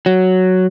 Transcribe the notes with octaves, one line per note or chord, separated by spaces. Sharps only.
F#3